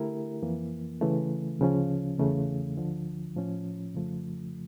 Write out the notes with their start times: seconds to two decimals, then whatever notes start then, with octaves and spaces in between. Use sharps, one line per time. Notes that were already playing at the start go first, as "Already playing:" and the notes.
Already playing: D3 A3 E4 G4 A#4
0.42 F2 E3 A#3
1.01 C#3 E3 A3
1.59 D2 C#3 F3 C#4
2.18 E2 C#3 E3 A3
2.77 D2 D3 F3
3.36 A2 F3 C#4
3.94 F2 C#3 F3 A3